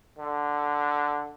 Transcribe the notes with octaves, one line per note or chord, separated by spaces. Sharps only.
D3